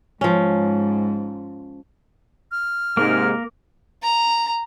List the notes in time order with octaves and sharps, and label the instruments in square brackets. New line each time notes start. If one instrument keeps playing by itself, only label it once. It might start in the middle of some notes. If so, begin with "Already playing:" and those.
[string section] G#2 [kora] F3 C#4
[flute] F6
[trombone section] G#2 C3 [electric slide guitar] A#3 A#4
[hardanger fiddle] A#5